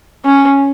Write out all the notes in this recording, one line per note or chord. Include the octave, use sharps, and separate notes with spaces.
C#4